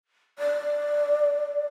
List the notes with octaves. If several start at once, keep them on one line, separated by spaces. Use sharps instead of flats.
D5